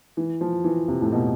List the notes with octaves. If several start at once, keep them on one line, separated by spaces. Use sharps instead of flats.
E3
F3
E3
C3
A2
B2